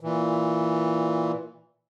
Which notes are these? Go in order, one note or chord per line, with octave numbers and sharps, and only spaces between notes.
A#2 E3